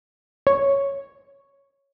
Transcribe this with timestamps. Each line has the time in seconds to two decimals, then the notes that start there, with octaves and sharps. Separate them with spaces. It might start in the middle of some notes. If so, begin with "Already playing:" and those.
0.47 C#5